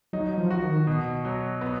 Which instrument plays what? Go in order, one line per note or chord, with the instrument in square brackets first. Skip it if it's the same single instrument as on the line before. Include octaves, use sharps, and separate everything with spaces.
[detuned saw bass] F#3 [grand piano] D#4
[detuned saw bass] F3
[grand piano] F#4
[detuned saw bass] D#3
[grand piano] B2
F#3
B3